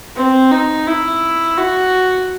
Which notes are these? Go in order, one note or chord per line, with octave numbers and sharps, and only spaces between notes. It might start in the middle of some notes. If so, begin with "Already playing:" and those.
C4
D#4
E4
F#4